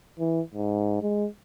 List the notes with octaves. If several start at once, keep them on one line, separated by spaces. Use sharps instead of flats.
E3
G#2
G#3